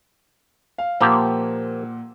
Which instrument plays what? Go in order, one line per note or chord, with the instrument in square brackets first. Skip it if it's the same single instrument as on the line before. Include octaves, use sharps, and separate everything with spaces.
[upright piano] F5
[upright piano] A#2 F#5 E6 [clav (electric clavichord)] F3 A#3 G4